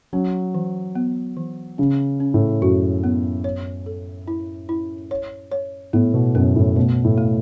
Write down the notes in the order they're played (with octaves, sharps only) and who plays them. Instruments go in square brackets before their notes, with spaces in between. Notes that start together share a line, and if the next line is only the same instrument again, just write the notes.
[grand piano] F#3 [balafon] C#4
[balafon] E3
B3
E3
[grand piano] C#3 [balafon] C#4
[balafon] C#4
[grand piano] A2
[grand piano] F#2 [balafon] F#4
[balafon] B3
C#5
A4
E4
E4
C#5
C#5
[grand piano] A2 [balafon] B3
[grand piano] B2
[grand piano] F#2 [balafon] B3
[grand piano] A2
[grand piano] B2 [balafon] A3
[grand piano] A2
[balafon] A3